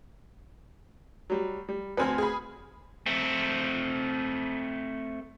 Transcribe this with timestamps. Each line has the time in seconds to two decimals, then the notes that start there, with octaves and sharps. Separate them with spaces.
1.30 F#3 G3
1.69 G3
1.97 D2 C4 B4 G#5 F6
2.18 G#4 B5
3.06 A3 C4